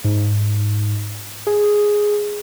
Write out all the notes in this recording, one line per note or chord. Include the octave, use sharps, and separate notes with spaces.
G#2
G#4